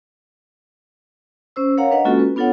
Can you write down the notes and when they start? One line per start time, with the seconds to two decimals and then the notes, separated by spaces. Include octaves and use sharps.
1.56 C#4 C5 E6
1.77 A#4 C#5 F5 F#5 A#5
1.91 D4 B4 D#5 F#5
2.05 G#3 A#3 C#4 F4 F#4 A4
2.19 B4
2.36 B3 D4 F4 A4 C#5 F#5